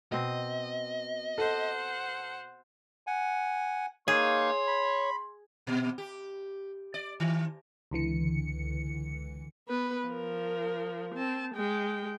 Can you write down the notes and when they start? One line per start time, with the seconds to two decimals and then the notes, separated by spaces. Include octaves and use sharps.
0.12 B2 C4 D#5
1.38 A4 C5 F#5
3.07 F#5 G#5
4.08 A#3 D#4 G#4 C#5 F5 C6
4.67 B5
5.67 A#2
5.98 G4
6.94 D5
7.20 D#3
7.91 C#2 D3 E3 C#7
9.68 B3 B4
10.08 F3 A#4
11.15 C4 A5
11.55 G#3 G5